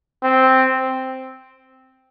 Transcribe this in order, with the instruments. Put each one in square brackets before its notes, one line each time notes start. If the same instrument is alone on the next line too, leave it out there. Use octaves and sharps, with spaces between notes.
[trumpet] C4